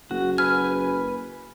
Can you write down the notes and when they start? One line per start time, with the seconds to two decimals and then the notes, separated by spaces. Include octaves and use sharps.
0.11 F#1 F#4
0.38 B4 G#5 F6